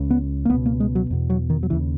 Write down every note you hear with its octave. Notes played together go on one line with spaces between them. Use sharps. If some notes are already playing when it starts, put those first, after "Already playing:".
Already playing: C#2 C#3
B3
A#3
C#2 B2 B3
A#3
G#3
F#3
E2 B2
F#3
D#3
F#3
D#2 C#3 E3